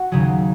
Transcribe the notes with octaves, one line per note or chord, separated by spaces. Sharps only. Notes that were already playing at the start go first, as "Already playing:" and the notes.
Already playing: F#4
D#2 C#3 F#3 G#4